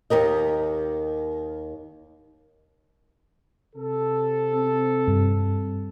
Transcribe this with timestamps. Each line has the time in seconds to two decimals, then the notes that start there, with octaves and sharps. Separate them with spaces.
0.10 D#2 G4 A#4 D#5
3.76 C3 A4
4.54 C4
5.07 G2